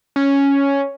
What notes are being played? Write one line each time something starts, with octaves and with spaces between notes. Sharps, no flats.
C#4